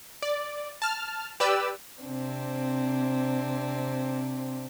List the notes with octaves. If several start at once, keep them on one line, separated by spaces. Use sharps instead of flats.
D5
A5 F6
G4 B4 D5 E6
C3 C4 D4